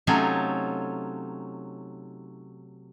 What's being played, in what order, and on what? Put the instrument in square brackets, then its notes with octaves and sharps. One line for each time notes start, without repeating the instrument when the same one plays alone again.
[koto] C3 F#3 A3 C#4 D#4 F4